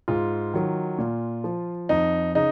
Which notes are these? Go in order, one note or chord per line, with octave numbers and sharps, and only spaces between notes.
G#2 F4
D#3 F#3
A#2
F3
F2 D#4
C#3 D#4